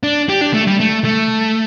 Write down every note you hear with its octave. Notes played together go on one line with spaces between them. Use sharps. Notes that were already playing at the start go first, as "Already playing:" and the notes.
D4
G4
D4
A3
G3
A3
A3